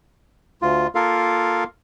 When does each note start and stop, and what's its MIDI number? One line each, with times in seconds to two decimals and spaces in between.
0.62 0.87 38
0.62 0.87 65
0.95 1.64 58
0.95 1.64 65
0.95 1.64 69
0.95 1.64 70
0.95 1.64 77